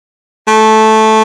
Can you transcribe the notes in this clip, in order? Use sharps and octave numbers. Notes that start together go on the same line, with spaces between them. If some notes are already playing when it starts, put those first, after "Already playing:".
A3